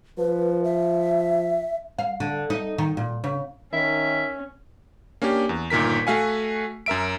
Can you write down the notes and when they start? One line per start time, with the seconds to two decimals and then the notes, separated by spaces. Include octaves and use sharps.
0.18 F3 B4
0.64 E5
1.99 F5
2.20 D3
2.50 D#4
2.78 D#3
2.97 A#2
3.24 C#3
3.73 D#3 C#4 E5
5.22 A#3 C#4 D4 G4
5.49 E2
5.70 G1 A#2 D#3 A#4 B6
6.07 A3 F#4 F5 F#5 G#5
6.86 F#2 A#4 E5 D7